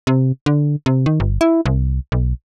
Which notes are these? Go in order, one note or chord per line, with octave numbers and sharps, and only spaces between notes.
C3
D3
C3
D#3
G1
E4
C2
B1